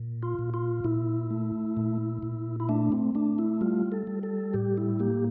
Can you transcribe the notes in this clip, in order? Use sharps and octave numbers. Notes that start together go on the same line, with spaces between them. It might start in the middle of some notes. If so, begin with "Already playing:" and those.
Already playing: A#2
F4
A#2
F4
A#2 E4
A3
A#2
A#2
E4
A3 D4
C4
A3 D4
E4
G3 F4
A4
G3
A4
A2 G4
E4
A#3 G4